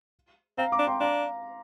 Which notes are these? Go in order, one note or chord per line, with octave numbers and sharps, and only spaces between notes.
C4 F5 A#5
A#5 D6
D4
G5 C6
D4 F5 A#5